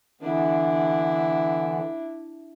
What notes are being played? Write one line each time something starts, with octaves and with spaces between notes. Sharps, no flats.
D3 E3 B3 D4 E4